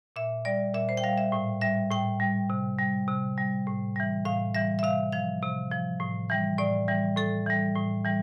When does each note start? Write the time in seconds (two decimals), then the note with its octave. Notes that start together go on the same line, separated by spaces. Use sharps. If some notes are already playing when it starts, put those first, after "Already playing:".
0.16 A#2 E5
0.45 G3 D5
0.74 A#2 E5
0.89 C5
0.97 G5
1.03 G3 F5
1.18 E5
1.32 A2
1.61 G3 E5
1.91 A2 G5
2.20 G3
2.50 C3
2.79 G3
3.08 C3
3.37 G3
3.67 A2
3.96 E3 G3
4.25 A2 F5
4.55 E3 G3 E5
4.79 E5
4.83 C3 F5
5.12 F3 F5
5.42 C3
5.71 F3
6.00 A2
6.30 E3 G3
6.58 A2 D5
6.88 E3 G3
7.16 A2 A4
7.46 E3 G3
7.76 A2
8.05 E3 G3